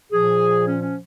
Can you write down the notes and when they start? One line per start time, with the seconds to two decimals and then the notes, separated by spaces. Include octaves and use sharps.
0.12 A#2 F3 G#4
0.67 C#4
0.81 C#4